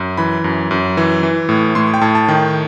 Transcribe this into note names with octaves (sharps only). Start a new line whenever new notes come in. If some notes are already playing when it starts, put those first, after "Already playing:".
Already playing: F#2
E3 B5
F#2
F#2
E3
E3
A2
A2 C6
G5
A2 A5
A5
D#3 G5